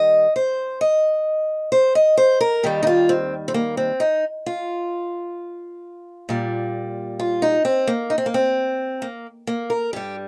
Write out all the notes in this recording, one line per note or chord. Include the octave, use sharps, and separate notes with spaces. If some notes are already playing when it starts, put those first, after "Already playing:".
Already playing: D#3 G3 D#5
C5
D#5
C5
D#5
C5
A#4
D#2 D#3 G3 G4
D#4
F4
C4
C4
A#3
C4
D#4
F4
A#2 G3
F4
D#4
C4
A#3
D#4
C4
A#3
C4
A#3
A#3
A#4
G2 G3 G4